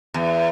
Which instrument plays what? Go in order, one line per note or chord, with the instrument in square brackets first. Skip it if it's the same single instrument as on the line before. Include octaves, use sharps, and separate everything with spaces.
[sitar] E2